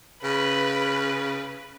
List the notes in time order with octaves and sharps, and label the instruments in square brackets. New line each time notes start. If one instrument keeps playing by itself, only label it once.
[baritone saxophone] C#3 [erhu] B4